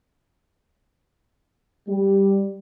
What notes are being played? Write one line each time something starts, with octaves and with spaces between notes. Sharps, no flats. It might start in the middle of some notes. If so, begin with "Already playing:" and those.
G3